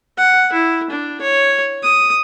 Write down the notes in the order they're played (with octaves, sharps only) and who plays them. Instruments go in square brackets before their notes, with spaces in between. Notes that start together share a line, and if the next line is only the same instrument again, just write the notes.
[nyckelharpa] F#5
E4
D4
C#5
D#6